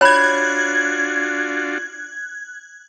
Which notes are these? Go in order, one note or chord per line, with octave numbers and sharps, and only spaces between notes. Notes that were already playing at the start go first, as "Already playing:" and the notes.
D4 F4 F#4 C#5 B5 F#6 G#6